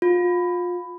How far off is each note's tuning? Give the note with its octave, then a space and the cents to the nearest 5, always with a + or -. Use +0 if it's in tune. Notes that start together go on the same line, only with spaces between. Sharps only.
F4 +25